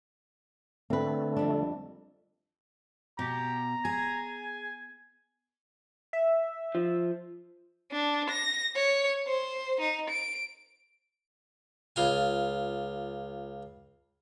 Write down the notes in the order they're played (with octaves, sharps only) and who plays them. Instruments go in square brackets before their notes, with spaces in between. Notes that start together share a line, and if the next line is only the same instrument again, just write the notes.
[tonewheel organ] D3 A3 [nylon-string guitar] C4 B4
[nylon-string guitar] F2 G3 D4
[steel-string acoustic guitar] B2 [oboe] G4 [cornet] A#5
[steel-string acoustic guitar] G#4 [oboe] G#5
[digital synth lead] E5
[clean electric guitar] F3
[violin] D4
A#6
C#5
C5
D#4
D7
[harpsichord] C#2 F4 G#5